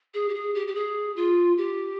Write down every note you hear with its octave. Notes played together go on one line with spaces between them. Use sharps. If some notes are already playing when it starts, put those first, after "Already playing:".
G#4
G4
G#4
G4
G4
G#4
F4
G4